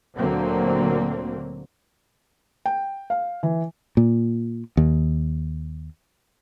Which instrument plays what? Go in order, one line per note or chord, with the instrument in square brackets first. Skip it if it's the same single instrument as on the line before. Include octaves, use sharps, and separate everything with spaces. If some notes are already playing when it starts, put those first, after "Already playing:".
[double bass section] D2 A#2 D3 F#3 A#3 C4
[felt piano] G5
F5
E3
[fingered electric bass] A#2
D#2